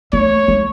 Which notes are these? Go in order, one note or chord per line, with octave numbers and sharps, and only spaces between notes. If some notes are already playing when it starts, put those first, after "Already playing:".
A3 C#5
G#3